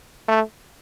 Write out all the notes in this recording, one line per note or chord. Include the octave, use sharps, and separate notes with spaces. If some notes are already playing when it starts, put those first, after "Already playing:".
A3